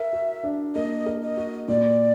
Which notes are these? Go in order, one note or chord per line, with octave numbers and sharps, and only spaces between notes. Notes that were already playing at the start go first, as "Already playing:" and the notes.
Already playing: A#4 E5
F#4
D4
A#3 D#5
A#4
D#5
F#4
A#2 D5